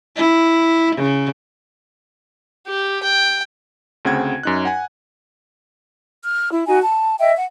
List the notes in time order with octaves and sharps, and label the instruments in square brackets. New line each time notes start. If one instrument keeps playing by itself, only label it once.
[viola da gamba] E4
C#3
[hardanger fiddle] G4
G5
[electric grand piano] D2 C#3 C4 F#5 G5 G#6
F#2 D#4 F#6
F#5 G#5
[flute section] F6
E4
D#4 F#4 G#5
A5
D#5 E5 G5
F#5